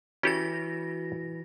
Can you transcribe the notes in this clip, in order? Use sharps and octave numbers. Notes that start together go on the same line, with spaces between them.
E3 C#4 F#4 G4 A4 A#6